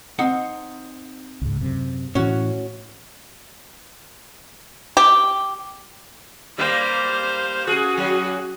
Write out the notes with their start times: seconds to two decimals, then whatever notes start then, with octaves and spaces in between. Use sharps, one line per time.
0.19 C4 D#4 F#5
1.42 C#2 G#2
1.61 F#2 C3
2.15 A2 E3 C#4 F#4
4.97 G4
6.58 G3 A#3 C5 F5
7.67 C#4 F#4 G#4
7.97 F#3 G#4